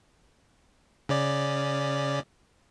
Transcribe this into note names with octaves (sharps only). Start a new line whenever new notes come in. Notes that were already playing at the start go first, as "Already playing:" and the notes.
C#3 C#4 D5